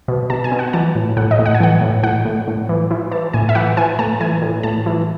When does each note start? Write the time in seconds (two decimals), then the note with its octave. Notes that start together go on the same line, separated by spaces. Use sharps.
0.08 B2
0.30 B2 A5
0.44 G#5
0.52 B2
0.59 F#5
0.73 E3 A5
0.95 A2
1.17 A2 F#5
1.31 D#5
1.39 A2
1.46 F#5
1.54 G#5
1.60 E3 F#5
1.81 A2
2.03 A2 F#5
2.25 A2
2.48 A2
2.69 E3
2.91 E3
3.11 E3 A5
3.33 A2 G#5
3.49 E5
3.55 E3 F#5
3.77 E3 G#5
3.99 A2 A5
4.21 E3 G#5
4.42 A2
4.63 A2 A5
4.86 E3